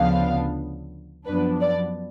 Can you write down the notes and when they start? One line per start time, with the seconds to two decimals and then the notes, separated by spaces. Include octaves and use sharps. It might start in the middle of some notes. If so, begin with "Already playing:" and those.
Already playing: D2 C#3 F3 B3 D4 F5
1.26 F#2 F3 B3 D4 B4
1.61 D5